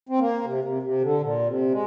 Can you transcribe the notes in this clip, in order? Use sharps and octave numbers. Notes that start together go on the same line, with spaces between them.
C4
A#3
C3
C3
C3
D3
A#2
C3
G#3